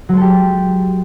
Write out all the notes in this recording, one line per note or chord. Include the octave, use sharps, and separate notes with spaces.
F#3 G#3 G4 A4